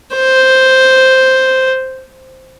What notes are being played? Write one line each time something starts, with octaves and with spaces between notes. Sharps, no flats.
C5